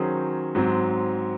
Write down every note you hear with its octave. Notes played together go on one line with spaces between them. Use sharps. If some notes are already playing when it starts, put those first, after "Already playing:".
Already playing: D#3 F#3 C#4 G#4 C5
G#2 F#3 C4